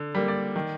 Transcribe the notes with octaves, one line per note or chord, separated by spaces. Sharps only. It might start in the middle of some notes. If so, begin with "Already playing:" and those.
Already playing: D3
G3 A#3
D5
D#3